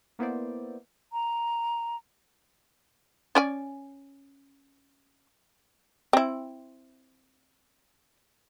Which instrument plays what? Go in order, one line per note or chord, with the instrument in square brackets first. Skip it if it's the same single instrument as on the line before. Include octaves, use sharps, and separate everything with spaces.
[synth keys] A#3 B3 E4 C5 D5
[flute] A#5
[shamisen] C#4 D5 G#5
C4 E4